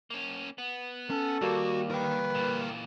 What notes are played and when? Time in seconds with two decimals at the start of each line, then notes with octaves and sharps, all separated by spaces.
0.10 A#3 C#4
0.58 B3
1.10 C#4 A4
1.42 D#2 G3 A#3 F#4
1.91 A#4 B4 G5
2.35 A#2 E3